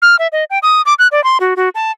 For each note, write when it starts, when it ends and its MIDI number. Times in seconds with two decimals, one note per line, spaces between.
0.02 0.16 89
0.19 0.27 76
0.32 0.44 75
0.50 0.59 79
0.63 0.82 87
0.86 0.94 86
0.99 1.08 90
1.12 1.23 74
1.24 1.38 84
1.40 1.54 66
1.57 1.69 66
1.75 1.92 81